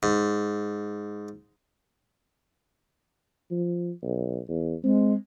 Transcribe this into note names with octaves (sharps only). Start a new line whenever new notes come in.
G#2
F3
B1
E2
G#3 C4